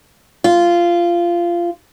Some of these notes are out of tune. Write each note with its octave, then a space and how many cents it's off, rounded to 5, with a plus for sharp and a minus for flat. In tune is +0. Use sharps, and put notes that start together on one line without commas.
F4 -15